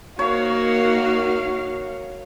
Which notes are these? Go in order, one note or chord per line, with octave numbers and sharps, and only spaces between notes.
A#3 D#4 F#4 A#4 C#5 F5